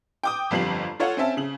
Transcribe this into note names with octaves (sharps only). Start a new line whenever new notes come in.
G5 D6 D#6
G1 F2 G3 C7 F#7
F4 A4 C#5 F5 F#5
C4 C#4 E5 A5
C#3 F#7